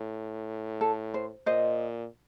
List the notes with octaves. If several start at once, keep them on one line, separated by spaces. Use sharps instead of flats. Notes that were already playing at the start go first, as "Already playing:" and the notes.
Already playing: A2
A4
C5
A#2 C5 D#5